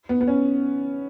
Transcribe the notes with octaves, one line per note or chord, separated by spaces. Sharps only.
B3
B3
C#4